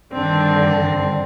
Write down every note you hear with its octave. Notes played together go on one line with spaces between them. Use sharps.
G2 D3 D#3 C4 D4